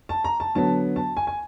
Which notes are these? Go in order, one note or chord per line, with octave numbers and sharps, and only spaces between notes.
A5
A#5
A5
D3 F#3 B3 A5
A5
G#5
G#5